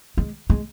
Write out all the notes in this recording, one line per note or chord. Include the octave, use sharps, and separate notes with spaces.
G#3
G#3